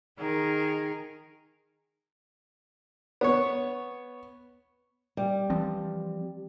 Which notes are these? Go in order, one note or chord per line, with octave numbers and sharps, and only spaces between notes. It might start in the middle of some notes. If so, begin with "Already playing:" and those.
D#3 G#4 A#4
B3 C#5
G3
E3 F3 C4